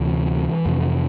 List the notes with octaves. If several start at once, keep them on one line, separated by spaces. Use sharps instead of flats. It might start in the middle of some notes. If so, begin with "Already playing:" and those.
Already playing: D2 C3 E3
F2 C3